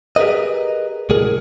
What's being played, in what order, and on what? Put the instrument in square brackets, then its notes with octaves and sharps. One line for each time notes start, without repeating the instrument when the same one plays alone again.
[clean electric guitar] G4 G#4 A#4 B4 D#5
C2 A2 G#4 A#4